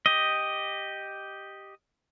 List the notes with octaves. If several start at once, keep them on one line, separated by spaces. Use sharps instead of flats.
G4 D#5